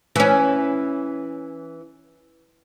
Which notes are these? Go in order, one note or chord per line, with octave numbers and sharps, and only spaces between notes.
E3 C#4